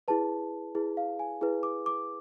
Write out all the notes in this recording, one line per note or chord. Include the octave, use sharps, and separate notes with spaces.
E4 G#4 B4 A5
E4 G#4 B4
F5
G#5
E4 G#4 B4
D6
D6